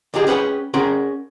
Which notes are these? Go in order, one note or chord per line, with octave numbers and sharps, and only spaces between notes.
D2 D#4 G4 G#4 D#5
C#4 G#4 B4 F#5 G5
C#4 G#4 A#4 F#5 G5 C6